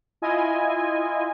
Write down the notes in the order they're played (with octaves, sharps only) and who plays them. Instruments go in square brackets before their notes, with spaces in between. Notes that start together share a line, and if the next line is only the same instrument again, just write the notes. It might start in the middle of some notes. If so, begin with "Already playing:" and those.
[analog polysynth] E4 F4 D#5 G#5